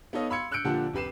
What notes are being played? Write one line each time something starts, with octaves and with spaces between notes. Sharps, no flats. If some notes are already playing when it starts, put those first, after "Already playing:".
B3 D#4 A4 C#5 D#5 F5
F5 B5 C6 E6 G#6 C#7
E6 F#6 G6 C#7 D7
A#2 D3 F3 G4 F#5 A5
F1 G4 B4 C7 E7